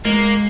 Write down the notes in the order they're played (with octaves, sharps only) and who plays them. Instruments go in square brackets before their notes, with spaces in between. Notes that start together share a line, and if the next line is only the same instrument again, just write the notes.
[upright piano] G#3 [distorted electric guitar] A#3